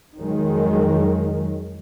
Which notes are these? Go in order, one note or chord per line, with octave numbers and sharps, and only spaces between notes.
F2 D#3 F#3 G#3